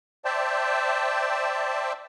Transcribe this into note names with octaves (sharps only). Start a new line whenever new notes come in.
C5 D5 E5 G5 A5